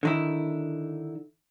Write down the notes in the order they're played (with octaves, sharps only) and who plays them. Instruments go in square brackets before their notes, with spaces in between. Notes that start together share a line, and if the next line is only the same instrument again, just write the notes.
[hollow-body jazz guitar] D3 D#3 E4